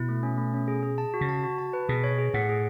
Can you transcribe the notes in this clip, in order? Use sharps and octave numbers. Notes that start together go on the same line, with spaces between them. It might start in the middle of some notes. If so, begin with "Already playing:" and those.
Already playing: B2 E4
A3
C#4
A3
C#4
G#4
G#4
A5
F#4
C#3
A5
F#4
A5
B4
B2 G#4
C#5
G#4
A2 F#5
G#4